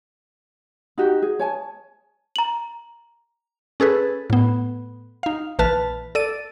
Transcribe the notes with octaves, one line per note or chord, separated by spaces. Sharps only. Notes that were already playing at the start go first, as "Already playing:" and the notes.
D#4 F#4 G4
G#4
C#5 G#5 A5
A#5 F#7
C#4 G#4 A4 B4
A2 B3
D#4 F5
A#1 E3 B4 A5 F6
A4 D5 D#7